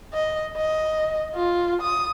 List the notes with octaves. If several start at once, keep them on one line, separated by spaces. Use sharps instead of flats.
D#5
D#5
F4
D#6